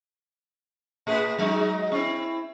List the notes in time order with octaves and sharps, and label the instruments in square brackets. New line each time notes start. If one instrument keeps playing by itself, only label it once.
[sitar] A2 G#4 B4
F#3 G#3 D#4
C4 E4